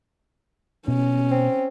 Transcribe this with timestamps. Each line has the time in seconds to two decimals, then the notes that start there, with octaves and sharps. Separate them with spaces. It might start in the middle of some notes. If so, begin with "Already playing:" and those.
0.88 B2 C#4
1.31 C4